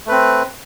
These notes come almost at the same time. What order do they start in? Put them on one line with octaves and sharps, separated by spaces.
A3 B4 C4